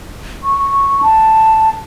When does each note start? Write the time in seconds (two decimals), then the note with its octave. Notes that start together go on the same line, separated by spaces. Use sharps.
0.44 C#6
1.03 A5